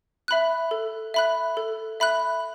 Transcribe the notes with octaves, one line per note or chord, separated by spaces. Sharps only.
E5 B5 F#6
A4
E5 B5 F#6
A4
E5 B5 F#6